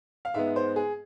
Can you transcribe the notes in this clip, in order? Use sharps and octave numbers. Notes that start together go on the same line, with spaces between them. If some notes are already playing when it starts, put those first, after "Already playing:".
F5
G#2 G#3 B3 E5
C5
G#4